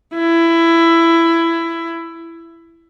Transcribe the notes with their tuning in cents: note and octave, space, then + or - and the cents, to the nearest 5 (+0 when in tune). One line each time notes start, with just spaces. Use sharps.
E4 +15